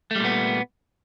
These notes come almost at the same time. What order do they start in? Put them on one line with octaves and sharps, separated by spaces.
A3 G3 A#2 B3